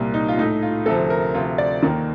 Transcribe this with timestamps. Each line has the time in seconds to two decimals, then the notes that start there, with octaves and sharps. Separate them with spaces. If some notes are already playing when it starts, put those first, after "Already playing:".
Already playing: C2 A#2 G3 A#3
0.14 D#4
0.28 F4
0.38 A2 A3 D#4
0.62 F4
0.86 D2 C3 F3 A4
1.10 A#4
1.35 D2 C3 F3 F4
1.58 D5
1.83 D#2 D#3 A#3